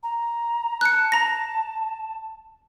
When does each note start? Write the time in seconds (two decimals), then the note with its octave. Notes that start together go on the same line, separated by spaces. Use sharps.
0.03 A#5
0.81 A5 F#6 C#7
1.12 A#5 A#6